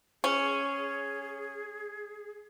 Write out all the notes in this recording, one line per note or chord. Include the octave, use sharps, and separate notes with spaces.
C#4 G#4